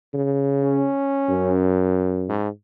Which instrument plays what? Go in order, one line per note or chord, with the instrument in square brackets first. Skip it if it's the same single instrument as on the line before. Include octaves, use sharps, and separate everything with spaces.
[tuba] C#3
[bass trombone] C#4
[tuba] F#2
[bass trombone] G#2